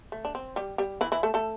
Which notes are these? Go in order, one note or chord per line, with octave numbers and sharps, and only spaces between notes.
A3
D4
C4
G3 G4
G3 G4
E3 E4
E3 E4
A3 A4
A3 A4